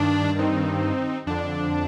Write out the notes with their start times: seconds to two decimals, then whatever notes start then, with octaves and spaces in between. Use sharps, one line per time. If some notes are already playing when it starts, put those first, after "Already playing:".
Already playing: G2 D#3 D4
0.34 D4
0.39 C4 D#4
1.26 F2 D3 D4